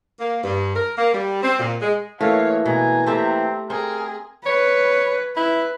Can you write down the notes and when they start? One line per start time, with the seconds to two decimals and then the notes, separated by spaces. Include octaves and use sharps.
0.19 A#3
0.43 G2
0.75 A#4
0.97 A#3
1.12 G3
1.42 C4
1.59 A#2
1.81 G#3
2.21 E3 A3 A#3 C#5 F5
2.66 B2 G#5 A#5
3.07 A3 C4 G4 E5
3.70 C4 G#4 A#4
4.46 B4 C#5
5.37 E4 B4